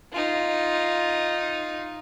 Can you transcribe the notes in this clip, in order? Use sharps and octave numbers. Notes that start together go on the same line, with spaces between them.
D#4 F4